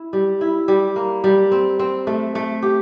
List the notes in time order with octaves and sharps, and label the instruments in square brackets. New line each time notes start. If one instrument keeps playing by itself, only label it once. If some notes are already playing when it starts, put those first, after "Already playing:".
Already playing: [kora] E4
G3
E4
G3
A#3
G3
C4
C4
A3
A3
G4